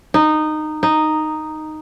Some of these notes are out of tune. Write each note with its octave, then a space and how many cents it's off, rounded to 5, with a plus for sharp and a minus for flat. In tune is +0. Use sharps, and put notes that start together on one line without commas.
D#4 -15
D#4 -5